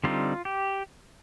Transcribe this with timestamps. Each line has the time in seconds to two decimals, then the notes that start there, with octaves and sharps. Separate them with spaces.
0.04 D3 G3 C4 D#4 F4
0.45 G4